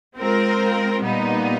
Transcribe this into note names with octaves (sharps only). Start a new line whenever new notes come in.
G#3 C4 F4 A#4
A#2 G3 B3 D#4